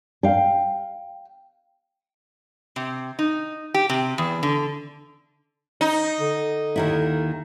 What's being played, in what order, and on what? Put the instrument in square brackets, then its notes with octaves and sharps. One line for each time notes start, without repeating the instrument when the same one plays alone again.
[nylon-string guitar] F5 G5
[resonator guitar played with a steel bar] C3
D#4
G4
C3
E2
D3
[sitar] D#4
[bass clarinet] D3
[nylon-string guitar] D#2 D#3 E4